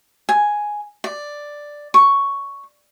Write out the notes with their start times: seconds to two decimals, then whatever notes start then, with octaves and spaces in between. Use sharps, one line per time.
0.29 G#5
1.04 D5
1.94 C#6